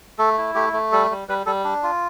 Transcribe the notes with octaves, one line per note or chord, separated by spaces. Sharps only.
A3 A4
E4
A3 G4
A3
G3 A4
G3
G3 B4
G3 A4
D4
F4